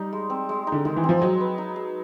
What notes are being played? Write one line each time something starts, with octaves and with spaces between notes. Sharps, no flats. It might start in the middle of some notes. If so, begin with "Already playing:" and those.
Already playing: G3 D#4
G#3
C4
G#3
D#4
D3
D#3 G#3
E3
C4
F3
F#3 D#5
B4
D#4
G#4